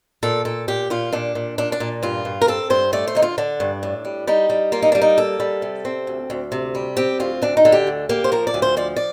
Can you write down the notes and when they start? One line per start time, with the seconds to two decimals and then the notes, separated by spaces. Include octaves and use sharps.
0.23 A#2 A4
0.45 A#2 A4
0.68 A#2 G4
0.90 A#2 F4
1.13 A#2 D4
1.35 A#2
1.58 A#2 D4
1.72 D4
1.80 A#2
2.03 G2 F4
2.25 G2
2.41 A#4
2.47 C4 A4
2.70 G2 C5
2.93 A3 D5
3.07 C5
3.15 D3 D#4
3.22 F4
3.38 D3 D4
3.60 G2
3.83 A2
4.05 G3
4.27 G3 D#4
4.50 G3
4.72 A#3 F4
4.82 D#4
4.92 G3 D4
5.02 D#4
5.17 A#3 A4
5.40 G3
5.62 C3
5.85 C4
6.07 D2
6.30 D2
6.52 C3
6.75 G3
6.97 C4 G4
7.20 D2 F4
7.42 D2 D4
7.57 D#4
7.65 D3
7.72 G4
7.87 D2
8.09 A#3 G4
8.24 C5
8.32 F3 A#4
8.47 D5
8.54 D2
8.62 C5
8.77 F3 D5
8.96 D5